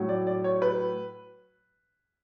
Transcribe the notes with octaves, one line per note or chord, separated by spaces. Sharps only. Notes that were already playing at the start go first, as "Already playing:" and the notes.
Already playing: A2 F#3
D5
D5
C#5
B4